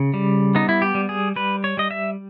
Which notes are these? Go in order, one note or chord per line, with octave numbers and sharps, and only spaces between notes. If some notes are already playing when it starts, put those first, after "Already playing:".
Already playing: C#3
G3
B3 D#4
E4
G4
G3
G#4
G3 B4
C#5
G3 D#5
E5